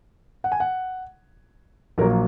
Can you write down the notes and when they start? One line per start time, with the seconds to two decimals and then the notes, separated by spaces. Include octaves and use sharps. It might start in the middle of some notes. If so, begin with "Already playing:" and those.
0.44 F#5
0.52 G#5
0.60 F#5
1.98 A#1 A#2 F#3 A#3 A#4